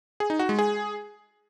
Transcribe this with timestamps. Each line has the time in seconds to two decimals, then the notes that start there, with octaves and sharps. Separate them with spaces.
0.20 G#4
0.30 D#4
0.39 F#4
0.49 G#3
0.59 G#4